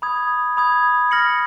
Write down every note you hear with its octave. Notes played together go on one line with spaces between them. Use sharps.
B5 D#6 G#6
B5 D#6 G#6
F6 A#6 C#7 F#7